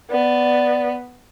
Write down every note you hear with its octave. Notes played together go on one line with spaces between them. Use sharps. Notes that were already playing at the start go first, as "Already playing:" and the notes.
B3 D5